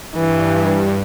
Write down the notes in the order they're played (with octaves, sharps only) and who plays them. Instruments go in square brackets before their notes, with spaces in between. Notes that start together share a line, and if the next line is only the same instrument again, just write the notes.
[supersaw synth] G2 [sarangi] E3